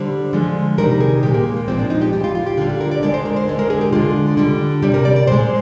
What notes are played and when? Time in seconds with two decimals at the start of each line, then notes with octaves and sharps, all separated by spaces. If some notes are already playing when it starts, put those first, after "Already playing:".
Already playing: D3 G3 C5
0.33 D3 F3 G#3
0.78 C3 D#3 G3 A#4
1.00 G#4
1.23 A#2 G#3 G4
1.34 A#3
1.57 A#3
1.68 A#2 F3 G#3 C4
1.79 D4
1.90 D#4
2.01 G4
2.13 A#2 G3 G4
2.24 F4
2.35 F4
2.46 G4
2.57 D3 G3 F4
2.69 G4
2.81 A#4
2.91 D5
3.02 D3 G#3 D5
3.14 C5
3.25 A#4
3.36 C5
3.48 D3 G#3
3.59 A#4
3.70 G#4
3.81 G4
3.92 D3 G#3 F4
4.37 D3 G3
4.82 C3 G3 G4
4.94 A#4
5.05 D5
5.16 D5
5.27 A#2 G#3 C5